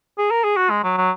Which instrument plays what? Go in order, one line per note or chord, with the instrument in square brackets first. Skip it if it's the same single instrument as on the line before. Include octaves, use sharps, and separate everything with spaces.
[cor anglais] G#4
A#4
G#4
F#4
G#3
F#3
F#3